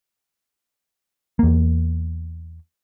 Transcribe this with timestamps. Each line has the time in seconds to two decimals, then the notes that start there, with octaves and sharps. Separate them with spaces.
1.39 E2 A#3